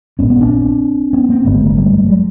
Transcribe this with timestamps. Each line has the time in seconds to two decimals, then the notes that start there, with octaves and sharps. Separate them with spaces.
0.19 A#1 G#2 B3 C#4
0.30 B3 C#4
0.40 C4 D4
1.13 B3 C#4
1.29 A#3 C4
1.45 G#1 G2 D3 A3 B3
1.55 G#3 A#3
1.65 G#3 A#3
1.76 G3 A3
1.98 G3
2.08 F#3 G#3